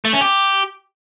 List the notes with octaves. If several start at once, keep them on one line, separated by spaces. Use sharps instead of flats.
A3
C#4
G4